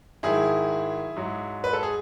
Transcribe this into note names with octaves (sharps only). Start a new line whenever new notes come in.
G#2 D#3 F#3 E4 G#4
G#2 F#3
B4
A4
G#4